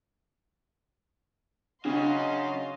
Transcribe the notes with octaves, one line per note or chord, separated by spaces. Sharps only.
C#3 F#3 C#4 D4 F#4 D#5 F5 C6